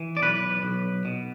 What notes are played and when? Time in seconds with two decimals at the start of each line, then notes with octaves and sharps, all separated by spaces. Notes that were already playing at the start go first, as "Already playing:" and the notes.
Already playing: E3
0.17 D5
0.22 B1 B4
0.63 B1
1.05 B2